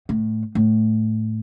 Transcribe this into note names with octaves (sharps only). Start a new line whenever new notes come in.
A2
A2